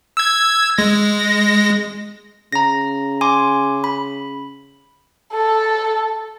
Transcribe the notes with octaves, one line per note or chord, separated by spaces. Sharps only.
E6 G#6
G#3 A#6
C#3 A#5 A#6
G#5 C6 D6
B5
A4